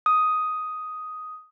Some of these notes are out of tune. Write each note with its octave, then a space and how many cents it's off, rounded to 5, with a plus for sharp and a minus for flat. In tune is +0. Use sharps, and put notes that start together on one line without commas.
D#6 +5